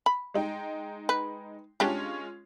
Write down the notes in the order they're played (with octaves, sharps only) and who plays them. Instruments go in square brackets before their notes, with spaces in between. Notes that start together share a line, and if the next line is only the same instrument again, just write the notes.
[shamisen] B5
[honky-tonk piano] G#3 D#4 G5
[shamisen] B4
[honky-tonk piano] G#3 C#4 F4 [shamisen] D4 G4